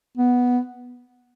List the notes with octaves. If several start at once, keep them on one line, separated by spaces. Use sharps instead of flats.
B3